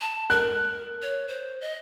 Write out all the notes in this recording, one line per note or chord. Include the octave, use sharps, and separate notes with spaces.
A5
A#4 F#6
C#5
C5
D#5